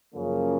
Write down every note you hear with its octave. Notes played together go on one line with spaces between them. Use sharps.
F#2 C#3 F3 A#3